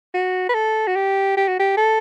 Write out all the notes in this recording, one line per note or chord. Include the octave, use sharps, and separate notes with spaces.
F#4
B4
A4
F#4
G4
G4
F#4
G4
A4